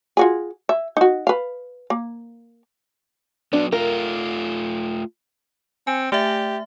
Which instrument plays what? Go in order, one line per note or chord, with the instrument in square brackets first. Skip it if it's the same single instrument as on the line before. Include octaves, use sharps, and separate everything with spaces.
[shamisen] F4 F#4 G#4
E5
D#4 F#4
B4 F5
A#3
[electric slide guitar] F#3 B3 [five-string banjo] D4
[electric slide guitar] A3 F4 [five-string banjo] A#4
[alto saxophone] C4 [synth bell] G#5
[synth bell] A3 E5 [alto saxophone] G4